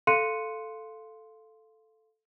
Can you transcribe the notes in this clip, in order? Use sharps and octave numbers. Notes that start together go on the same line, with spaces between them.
A4 F5 C6 F#6 C#7 D#7